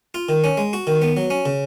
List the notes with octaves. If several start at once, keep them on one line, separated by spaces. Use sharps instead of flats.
F4
D#3
C#4
G#3
F#4
D#3
B3
F#3
C#4
C#3